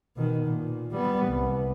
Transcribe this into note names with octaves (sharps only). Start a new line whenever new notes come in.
B2 D#3
A#2
G3 B3
C2